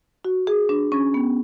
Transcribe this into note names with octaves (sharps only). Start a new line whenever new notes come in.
F#4
G#4
D4
C#4
B3